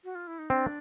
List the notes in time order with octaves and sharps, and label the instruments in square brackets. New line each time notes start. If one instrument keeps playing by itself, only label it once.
[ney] F#4
F4
E4
D#4
[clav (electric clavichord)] C4 [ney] D4